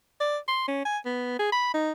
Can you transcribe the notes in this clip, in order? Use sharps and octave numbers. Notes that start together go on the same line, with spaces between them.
D5
C6
C#4
G#5
B3
G#4
B5
D#4